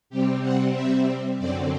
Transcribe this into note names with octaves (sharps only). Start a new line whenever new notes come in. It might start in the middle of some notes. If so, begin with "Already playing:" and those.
C3 G3 C4 G4
F#5
E5
F#2 D3 F#3 C4 D5